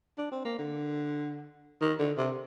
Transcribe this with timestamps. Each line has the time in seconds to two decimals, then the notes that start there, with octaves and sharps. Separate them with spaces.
0.18 D4
0.32 C4
0.45 A#3
0.59 D3
1.81 D#3
1.99 D3
2.17 C3